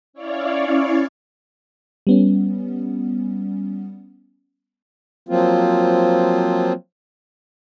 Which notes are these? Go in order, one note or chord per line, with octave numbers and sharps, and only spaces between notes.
C#4 E4 C#5 D5 F5
G3 B3 C#4
F3 F#3 A#3 C4 F4